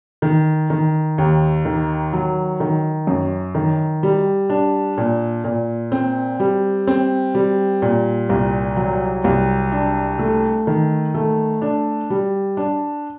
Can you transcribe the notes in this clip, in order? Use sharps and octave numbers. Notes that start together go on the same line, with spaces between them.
D#3
D#3
D#2
D#3
F#3
D#3
F#2
D#3
G3
D4
A#2
A#2
C4
G3
C4
G3
A#2
C2
F#3
C2
D4
A3
D#3
A3
D4
G3
D4